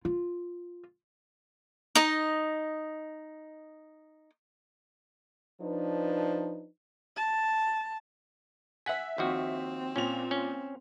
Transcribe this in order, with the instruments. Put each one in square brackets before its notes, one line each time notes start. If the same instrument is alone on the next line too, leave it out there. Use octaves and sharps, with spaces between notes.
[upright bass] F4
[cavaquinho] D#4 D#5
[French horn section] F3 D4 D#4 B4
[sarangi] A5
[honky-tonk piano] E5 B6 [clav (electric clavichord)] F#5 G#5
[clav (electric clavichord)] D#2 F3 F#4 [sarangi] C4
[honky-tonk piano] A#2 F7 [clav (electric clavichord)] C#4
[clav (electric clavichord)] C#4